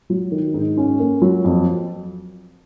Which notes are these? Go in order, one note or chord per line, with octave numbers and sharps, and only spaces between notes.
F#3
D#3
G#2
C#4
A#3
F#3
F2